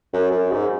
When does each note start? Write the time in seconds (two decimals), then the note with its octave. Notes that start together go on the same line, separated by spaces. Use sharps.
0.13 F#2
0.32 F#2
0.51 G#2